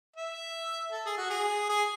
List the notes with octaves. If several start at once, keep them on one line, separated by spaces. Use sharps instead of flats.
E5
A4
G#4
F#4
G#4
G#4